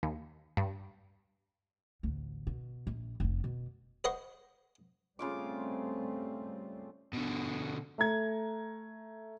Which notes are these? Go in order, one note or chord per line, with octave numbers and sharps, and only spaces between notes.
D#2
G2
A1 D2
B2
A#1
F1 B3
B2
B4 C5 D#5 F#5 C6 C#6
C#3 G3 A3 C4 F4 D6
B2 D3
A3 A#5 G#6